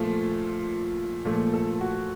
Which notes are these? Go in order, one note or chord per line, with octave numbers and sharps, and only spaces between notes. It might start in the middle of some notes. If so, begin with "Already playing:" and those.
Already playing: A#2 F3 A3 F4
A#2 F3 A3
A4
F#4